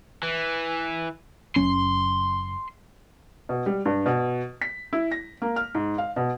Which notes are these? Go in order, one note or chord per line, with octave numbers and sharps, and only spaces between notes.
E3
F#1 F#3 C#4 C6
B2
G3
G2
B2
B6
E4
A#6
A#3
F6
G#2
F5
B2